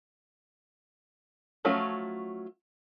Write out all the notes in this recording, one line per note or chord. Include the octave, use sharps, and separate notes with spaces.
F3 F#3 A3 C#4 F4